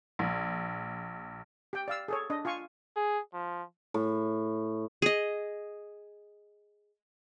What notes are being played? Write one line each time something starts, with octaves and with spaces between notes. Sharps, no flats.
A#1
G4 G5
D5 F5 E6
G#4 A4 C#5
D4 D#5
F4 F5 G#5 C#6
G#4
F3
A2
G#4 D#5